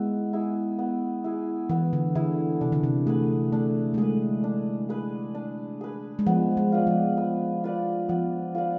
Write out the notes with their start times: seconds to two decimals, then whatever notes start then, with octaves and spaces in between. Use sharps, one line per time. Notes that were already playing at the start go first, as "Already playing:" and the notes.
Already playing: G#3 B3 E4
0.33 E4 G#4
0.79 B3
1.24 E4 G#4
1.70 E3 B3
1.93 D3
2.15 D3 E4 G#4
2.61 C3 D4
2.72 D3
2.83 C3
3.07 A3 G#4 B4
3.52 A3 D4
3.94 A3
3.98 G#3 G#4 B4
4.44 D4
4.89 G#4 B4
5.35 D4
5.81 G#4 B4
6.19 G#3
6.27 F3 B3
6.57 G#3
6.72 F4 B4 D5
6.87 F3
7.17 B3
7.64 F4 B4 D5
8.09 F3 B3
8.55 F4 B4 D5